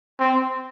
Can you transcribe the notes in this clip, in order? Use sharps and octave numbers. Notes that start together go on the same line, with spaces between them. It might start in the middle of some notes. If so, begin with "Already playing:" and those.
C4